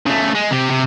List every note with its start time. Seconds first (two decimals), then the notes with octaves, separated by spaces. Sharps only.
0.07 C#3 A3
0.35 G#3
0.51 C3 G4
0.70 C3